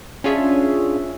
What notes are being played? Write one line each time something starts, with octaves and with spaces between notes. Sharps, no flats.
C#4 D4 F4 G#4 C#5 E5